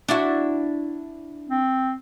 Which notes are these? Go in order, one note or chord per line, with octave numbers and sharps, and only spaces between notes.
D4 E4 F#4
C4